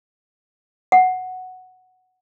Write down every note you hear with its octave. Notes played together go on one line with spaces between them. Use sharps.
F#5